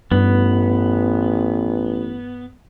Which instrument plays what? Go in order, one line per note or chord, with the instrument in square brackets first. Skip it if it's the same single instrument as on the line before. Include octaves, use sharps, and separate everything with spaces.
[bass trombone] A1 [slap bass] G2 [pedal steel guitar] B3